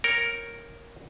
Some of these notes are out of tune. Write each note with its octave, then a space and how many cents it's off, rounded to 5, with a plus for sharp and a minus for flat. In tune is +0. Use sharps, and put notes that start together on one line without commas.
A#4 +0 C#5 -5 G5 +0